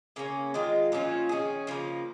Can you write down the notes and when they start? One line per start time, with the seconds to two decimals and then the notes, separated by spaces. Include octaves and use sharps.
0.16 C#3 A#3 C#4
0.54 D#3 G#3 F4
0.92 A#2 F3 C#4 F4
1.29 D#3 C#4 G#4
1.67 C#3 F3 A#3